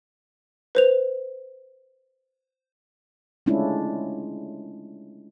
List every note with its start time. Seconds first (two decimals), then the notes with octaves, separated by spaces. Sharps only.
0.75 B4 C5 F7
3.46 G#3 A3 C#4 D4 E4 F4